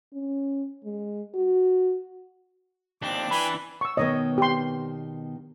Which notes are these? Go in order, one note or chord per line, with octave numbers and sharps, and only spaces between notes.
C#4
G#3
F#4
D#2 C4 D4 D6
E3 B4 G5 G#5 B5
C#6 E6
B2 D#3 B3 C#5 D#5
G4 C6